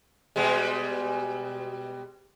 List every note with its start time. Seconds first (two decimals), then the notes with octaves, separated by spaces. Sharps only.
0.36 B2 G3 G#3